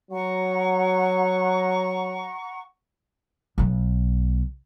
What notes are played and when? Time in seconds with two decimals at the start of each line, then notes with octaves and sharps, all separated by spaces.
0.11 F#3 F#5 A#5 C#6
3.58 B1 B3